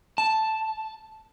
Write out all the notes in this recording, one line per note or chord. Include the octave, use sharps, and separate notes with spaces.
A5